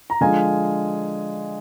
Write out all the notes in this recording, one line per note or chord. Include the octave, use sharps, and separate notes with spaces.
A#5
D3 F3 G#3 F5 G#5